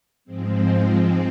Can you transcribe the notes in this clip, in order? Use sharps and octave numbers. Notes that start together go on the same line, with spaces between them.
G#2 F3 G#3 C4